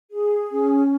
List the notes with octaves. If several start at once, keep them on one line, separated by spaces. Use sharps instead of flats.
G#4
C#4